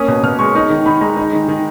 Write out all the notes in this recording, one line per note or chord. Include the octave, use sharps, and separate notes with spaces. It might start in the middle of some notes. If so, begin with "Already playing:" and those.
Already playing: A#3 C#4 D#6
B2
B2 F6
G#3 C#6
D#4
D#3
D#3 B5
G#3 A#5
D#4
D#3
D#3